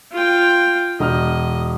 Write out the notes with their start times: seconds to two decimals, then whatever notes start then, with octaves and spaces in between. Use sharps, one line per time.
0.13 F4 G5
1.00 E1 D#5 F6